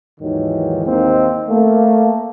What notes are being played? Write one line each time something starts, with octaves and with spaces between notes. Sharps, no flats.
D#2 G#2 D#3 E3 F#3
D#2 A#3 C4 D#4
A3 A#3